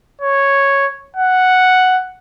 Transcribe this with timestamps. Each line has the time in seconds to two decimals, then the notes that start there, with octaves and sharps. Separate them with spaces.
0.21 C#5
1.16 F#5